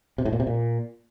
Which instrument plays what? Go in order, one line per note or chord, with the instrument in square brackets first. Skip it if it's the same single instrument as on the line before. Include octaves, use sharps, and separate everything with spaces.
[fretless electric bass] C3
A2
A#2
C3
A#2